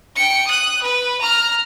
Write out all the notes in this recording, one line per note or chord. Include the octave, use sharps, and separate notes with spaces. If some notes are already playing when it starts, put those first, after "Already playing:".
G5 C#7
D#6 F#6
B4
A#5 F6